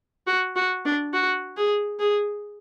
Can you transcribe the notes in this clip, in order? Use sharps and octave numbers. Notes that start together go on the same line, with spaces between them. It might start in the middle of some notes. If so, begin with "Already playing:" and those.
F#4
F#4
D4
F#4
G#4
G#4